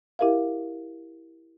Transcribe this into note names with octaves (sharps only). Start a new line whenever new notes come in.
E4 G4 A#4 E5 F5